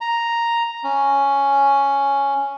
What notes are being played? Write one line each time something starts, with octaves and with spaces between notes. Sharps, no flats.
A#5
C#4